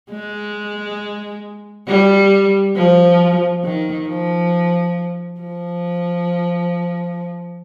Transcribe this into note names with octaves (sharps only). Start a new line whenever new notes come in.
G#3
G3
F3
D#3
F3
F3